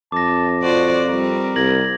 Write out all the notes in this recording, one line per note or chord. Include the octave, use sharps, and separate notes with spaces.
F2 A5 D6 A#6
F4 F#4 C5 D5
G3 C4 A#4
C2 G#6 A#6 F#7